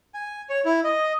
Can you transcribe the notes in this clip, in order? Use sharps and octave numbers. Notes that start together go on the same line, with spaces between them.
G#5
C#5
E4
D#5